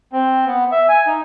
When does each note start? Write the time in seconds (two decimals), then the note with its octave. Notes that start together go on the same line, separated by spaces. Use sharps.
0.13 C4
0.47 B3
0.72 E5
0.89 G#5
1.07 D#4